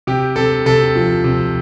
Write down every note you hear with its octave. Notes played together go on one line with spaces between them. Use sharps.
C3 G4
C3 A4
C3 A4
F3
C3